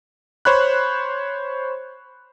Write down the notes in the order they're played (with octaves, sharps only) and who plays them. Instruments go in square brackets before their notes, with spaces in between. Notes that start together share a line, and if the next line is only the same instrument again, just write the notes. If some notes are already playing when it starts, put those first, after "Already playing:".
[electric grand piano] C5 C#5 B5 F#6